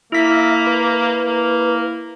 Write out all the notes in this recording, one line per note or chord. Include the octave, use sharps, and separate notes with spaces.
A#3 E4 E5 B6
B4
A#3